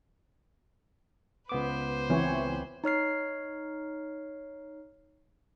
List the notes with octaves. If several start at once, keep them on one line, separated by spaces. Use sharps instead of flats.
C#2 B3 B4 C5 D6
E3 C4 F#4 C#5
D#4 C#5 F6 C7